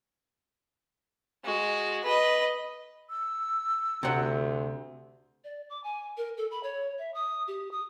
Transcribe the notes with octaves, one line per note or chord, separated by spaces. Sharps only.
G#3 F#4
B4 D#5
E6
D2 C3 F#5
D5
D6
G#5
A#4
A4
B5
C#5
E5
D#6
G4
D#6